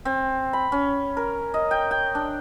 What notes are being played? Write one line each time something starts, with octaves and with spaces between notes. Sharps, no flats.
C4
B5
C#4
A#4
D#5
G5
G5
D4